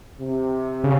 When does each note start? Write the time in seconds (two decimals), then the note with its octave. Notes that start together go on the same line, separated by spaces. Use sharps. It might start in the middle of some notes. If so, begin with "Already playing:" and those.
0.20 C3
0.84 C#3